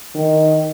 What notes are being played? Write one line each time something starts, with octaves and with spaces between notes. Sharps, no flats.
D#3